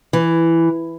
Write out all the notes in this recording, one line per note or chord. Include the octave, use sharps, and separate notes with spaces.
E3